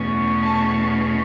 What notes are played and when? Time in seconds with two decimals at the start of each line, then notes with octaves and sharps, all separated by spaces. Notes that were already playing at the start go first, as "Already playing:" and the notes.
Already playing: E2 B2 A3 C#4
0.43 A5